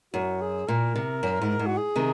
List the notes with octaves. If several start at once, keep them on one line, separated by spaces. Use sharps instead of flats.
F#2 F#4
G#4
A#2 A#4
C3
F#2
G#2
G#2
F#4
G#4
C3 D#3